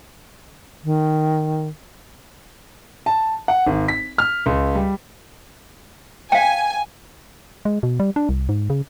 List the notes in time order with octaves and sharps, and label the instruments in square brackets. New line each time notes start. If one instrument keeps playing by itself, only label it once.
[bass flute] D#3
[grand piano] A5
F#5
G#1
B6
F6
C#2
G3
[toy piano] F5 G5 [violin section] G#5
[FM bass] G#3
B2
G3
D4
C2
G#2
C#3